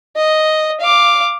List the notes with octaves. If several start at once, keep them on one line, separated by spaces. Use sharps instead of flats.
D#5
F5 D6